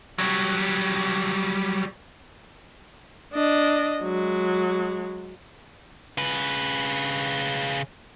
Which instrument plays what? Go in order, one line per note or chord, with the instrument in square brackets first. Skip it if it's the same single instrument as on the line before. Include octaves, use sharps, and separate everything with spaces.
[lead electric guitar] F#3 G3
[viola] D4 D#5
F#3 G#3
[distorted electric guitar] C#3 B4